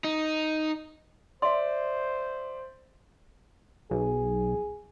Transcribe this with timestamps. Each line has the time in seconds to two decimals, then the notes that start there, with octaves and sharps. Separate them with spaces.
0.04 D#4
1.42 C5 D5 E5 C6
3.91 B1 G#4